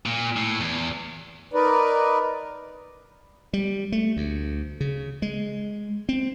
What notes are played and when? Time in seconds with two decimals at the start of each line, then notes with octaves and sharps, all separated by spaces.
0.06 A#2
0.36 A2
0.60 E2
1.53 D#4 A#4 B4 D5
3.53 G3
3.92 A3
4.17 D2
4.81 C#3
5.22 G#3
6.09 C4